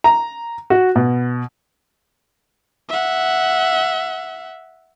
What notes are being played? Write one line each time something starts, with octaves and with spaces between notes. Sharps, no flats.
A#5
F#4
B2
E5 F#5